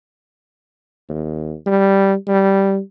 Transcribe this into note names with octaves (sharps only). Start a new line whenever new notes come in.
D#2
G3
G3